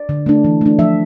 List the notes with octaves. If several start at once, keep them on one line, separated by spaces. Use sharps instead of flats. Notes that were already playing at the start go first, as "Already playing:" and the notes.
Already playing: D5
D3
A3 D4
E3
A3 D4
F3 E5